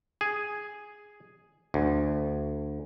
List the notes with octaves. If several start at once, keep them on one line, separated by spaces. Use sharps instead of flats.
G#4
D2